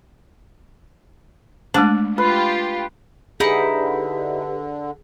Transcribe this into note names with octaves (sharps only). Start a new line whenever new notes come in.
G#3 A3 D4 A5
F4 G4 B4
D3 D#4 E4 G4 G#4 B4